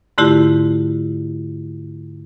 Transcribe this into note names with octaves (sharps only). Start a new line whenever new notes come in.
G#2 D3 A3 E4 F4 G4